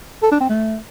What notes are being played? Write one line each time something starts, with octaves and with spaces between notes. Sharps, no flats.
A4
D4
C4
A3